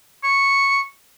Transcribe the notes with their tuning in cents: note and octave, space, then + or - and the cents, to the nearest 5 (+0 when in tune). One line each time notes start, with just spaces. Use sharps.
C#6 -5